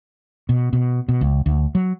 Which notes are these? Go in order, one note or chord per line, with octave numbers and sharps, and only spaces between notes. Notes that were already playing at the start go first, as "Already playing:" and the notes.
B2
B2
B2
C#2
D2
F#3